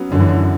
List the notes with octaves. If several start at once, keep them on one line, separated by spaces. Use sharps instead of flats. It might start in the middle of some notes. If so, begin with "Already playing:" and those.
Already playing: F#3 B3 C#4
F#2 D3
E3
D3